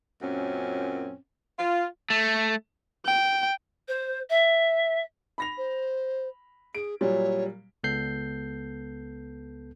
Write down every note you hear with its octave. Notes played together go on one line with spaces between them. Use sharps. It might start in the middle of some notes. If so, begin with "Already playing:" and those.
F#2 A#2 C4 C#4
F4
A3
G5
C5
E5
B5 A#6 F7
C5
G#4 D7
A#2 F#3 G3 C#5
C#2 B3 A4 G6 C7